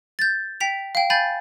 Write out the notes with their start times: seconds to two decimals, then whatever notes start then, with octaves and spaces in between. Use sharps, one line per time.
0.19 G6 A6
0.60 G5 B6 F7
0.95 F5 G5
1.10 F5 G#5 B5 G6 A6